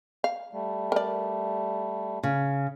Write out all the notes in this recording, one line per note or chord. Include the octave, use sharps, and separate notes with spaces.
F5
G3 A3
A#4 D5
C#3